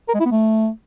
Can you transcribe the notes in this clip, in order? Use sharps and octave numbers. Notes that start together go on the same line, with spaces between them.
A#4
G#3
E4
B3
A3